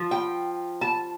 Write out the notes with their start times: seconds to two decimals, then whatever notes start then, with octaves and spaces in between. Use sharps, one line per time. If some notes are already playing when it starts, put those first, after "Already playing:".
Already playing: F3
0.11 G5
0.81 A5